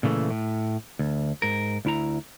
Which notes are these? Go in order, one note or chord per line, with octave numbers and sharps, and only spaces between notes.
A#2 C#3 E3 A3
A2
D2
G#2 A#4
D2 E4 A#5